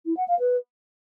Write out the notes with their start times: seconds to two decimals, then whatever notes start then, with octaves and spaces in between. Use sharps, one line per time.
0.06 E4
0.17 F#5
0.28 F5
0.39 B4